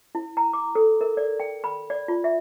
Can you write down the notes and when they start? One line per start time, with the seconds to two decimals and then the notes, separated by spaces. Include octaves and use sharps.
0.15 E4
0.37 A#5
0.53 D6
0.75 A4
1.01 A#4
1.17 D5
1.40 G5
1.64 B5
1.90 D5
2.08 F4
2.24 E5